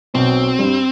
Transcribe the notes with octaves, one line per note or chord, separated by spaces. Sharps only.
B1 B2 C4
G2 G3